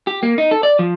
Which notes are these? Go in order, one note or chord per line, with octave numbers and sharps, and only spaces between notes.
G4
A#3
D#4
A4
D5
F3